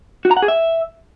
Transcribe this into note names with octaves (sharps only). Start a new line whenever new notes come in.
F#4
A#5
F#5
G#4
E5